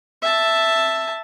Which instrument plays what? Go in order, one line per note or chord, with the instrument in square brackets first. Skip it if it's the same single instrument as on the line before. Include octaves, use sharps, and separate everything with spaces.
[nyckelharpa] E5 A5